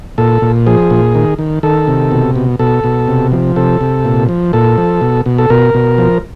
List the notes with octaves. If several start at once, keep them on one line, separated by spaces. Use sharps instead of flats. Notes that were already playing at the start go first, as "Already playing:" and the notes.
A#2 A4
A#2
F3 G#4
A#2
D#3
D#3
D#3 A4
C3
B2
B2
B2 A4
B2
C3
F3
C3 A4
C3
A#2
F3
A#2 A4
F3
B2
B2
A4
B2 A#4
B2
F3